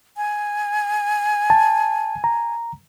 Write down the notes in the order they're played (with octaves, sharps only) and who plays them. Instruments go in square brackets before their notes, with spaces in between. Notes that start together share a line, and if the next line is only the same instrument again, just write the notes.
[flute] G#5
[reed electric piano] A5
A#5